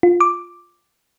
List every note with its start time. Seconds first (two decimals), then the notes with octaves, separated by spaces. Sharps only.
0.03 F4
0.20 D6